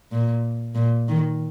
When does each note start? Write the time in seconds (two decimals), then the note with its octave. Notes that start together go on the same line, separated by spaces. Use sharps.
0.11 A#2
0.75 A#2
1.08 D#3